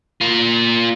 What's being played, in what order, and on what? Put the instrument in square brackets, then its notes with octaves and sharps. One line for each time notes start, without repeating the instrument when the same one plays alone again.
[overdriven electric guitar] A#3 F4